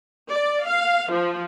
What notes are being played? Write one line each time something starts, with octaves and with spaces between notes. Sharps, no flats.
D5
F5
F3